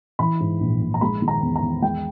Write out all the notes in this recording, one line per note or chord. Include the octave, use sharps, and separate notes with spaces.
E3 B5
G#2
A#1
A#1
A#5
G#3 B5
D#3
A#5
E2
A#5
E2
G#3 G5